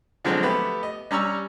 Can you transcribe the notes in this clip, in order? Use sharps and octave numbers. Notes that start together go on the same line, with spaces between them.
D3 F3 F#3 G#3 C4
A3 B3 G4
D#5
G3 C#4 A#5 C#6 E6